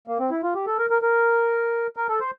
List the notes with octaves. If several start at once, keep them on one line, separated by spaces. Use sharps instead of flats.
A#3
C4
E4
F4
G4
A4
A#4
A#4
A#4
A#4
A4
C5